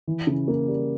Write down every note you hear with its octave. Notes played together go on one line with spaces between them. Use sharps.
E3
C#3
A#3
G3